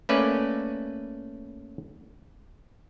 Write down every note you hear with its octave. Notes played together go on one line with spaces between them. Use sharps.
A3 A#3 C#4 B4 D5